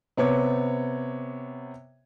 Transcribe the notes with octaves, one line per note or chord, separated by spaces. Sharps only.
C3 B3 C#5 D6